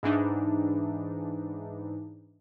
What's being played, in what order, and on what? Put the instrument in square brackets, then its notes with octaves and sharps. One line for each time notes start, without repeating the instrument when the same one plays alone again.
[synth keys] G#2 E3 D4 D#4